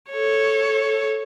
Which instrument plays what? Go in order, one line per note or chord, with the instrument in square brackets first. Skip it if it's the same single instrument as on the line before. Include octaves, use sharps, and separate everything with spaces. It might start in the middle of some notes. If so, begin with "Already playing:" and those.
[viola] A4 C#5